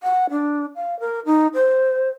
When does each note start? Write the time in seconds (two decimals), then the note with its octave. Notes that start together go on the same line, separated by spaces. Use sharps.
0.03 F#5
0.31 D4
0.76 F5
1.00 A#4
1.26 D#4
1.54 C5